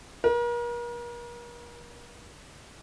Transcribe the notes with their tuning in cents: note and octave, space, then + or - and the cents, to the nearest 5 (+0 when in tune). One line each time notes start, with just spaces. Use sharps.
A#4 +40